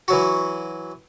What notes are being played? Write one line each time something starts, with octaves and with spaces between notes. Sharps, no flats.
E3 F#3 F#4